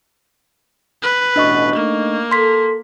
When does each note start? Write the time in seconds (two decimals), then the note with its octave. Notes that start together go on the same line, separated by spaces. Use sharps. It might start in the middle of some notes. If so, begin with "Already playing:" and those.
1.03 B4
1.36 A1 B2 D4 D#5 C#6
1.75 A3 A#3 D#4
2.31 A4 C6 B6